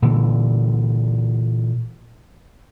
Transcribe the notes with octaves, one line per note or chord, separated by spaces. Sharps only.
A#2 D3 E3